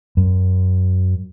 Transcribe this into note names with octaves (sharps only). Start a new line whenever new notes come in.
F#2